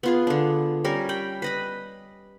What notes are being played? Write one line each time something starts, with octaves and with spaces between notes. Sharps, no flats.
B3 F4 G#4
D3 D4
G3 C#4 A#4
G5 B5
B4 D#5 B5